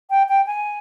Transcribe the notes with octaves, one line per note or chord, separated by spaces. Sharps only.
G5
G5
G#5